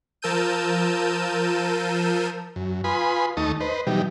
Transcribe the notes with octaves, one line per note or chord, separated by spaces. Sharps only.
F3 A#4 A5 E6 G6 D#7
F#2
F4 B4 G#5 B5 C6 D#6
D#2 A3 D#4 A5 C#6 D#6
B4 C5 D#5
B2 E3 F#3 G3 D#4 G4